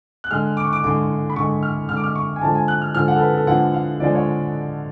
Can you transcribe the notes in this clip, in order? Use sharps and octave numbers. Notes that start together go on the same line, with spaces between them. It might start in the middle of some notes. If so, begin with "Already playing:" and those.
F#6
D3 G#3 F6
D6
C#6
D6
D3 G#3 D6
B5
D3 G#3 C#6
F6
D3 G#3 F6
D6
F6
C#6
G#5
D3 F3 G#3 A5
G#5
F#6
F6
D3 F3 G#3 F6
F#5
A4
B4
A4
D3 F3 G#3 F#5
F5
D3 F3 G#3 D5
C#5